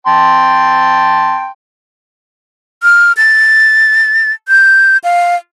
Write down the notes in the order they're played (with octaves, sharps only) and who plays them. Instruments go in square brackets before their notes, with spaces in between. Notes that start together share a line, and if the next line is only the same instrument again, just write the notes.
[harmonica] G5 A5 C6
[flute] F6
A6
G6
F5